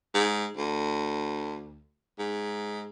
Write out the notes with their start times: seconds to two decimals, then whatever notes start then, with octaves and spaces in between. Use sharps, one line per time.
0.14 G#2
0.57 D2
2.19 G#2